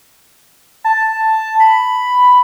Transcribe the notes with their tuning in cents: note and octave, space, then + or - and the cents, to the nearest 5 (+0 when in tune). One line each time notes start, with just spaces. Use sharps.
A5 +5
B5 +5